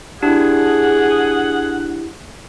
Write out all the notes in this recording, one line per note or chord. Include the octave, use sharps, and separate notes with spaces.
D4 E4 G4 G#4 F#5